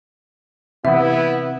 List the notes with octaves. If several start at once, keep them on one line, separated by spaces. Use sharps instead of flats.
C3 E3 B3 E4 E5